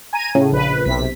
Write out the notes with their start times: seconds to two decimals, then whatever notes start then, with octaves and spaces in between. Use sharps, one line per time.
0.13 G#5 A#5 D#7
0.35 A2 C#3
0.52 A#1 B4
0.85 B1 C3 B6